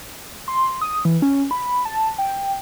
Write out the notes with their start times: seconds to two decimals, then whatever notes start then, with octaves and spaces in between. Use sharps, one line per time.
0.48 C6
0.81 D#6
1.05 E3
1.22 C#4
1.51 B5
1.85 A5
2.18 G5